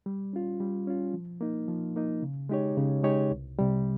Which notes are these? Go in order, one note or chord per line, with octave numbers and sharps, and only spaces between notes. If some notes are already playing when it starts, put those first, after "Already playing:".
G3
C#4 F4
G3
C#4 F4
F3
A#3 D#4
F3
A#3 D#4
C#3
G#3 D#4 G4 C#5
C#3
G#3 D#4 G4 C#5
C2
C3 G3